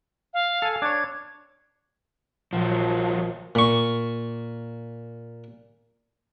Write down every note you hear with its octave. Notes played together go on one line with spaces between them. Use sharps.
F5
A4 G#5
D4 C#5 G#6
A#1 F3 F#3
A#2 C#6